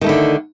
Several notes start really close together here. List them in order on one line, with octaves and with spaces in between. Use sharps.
D#3 A3 E4 D3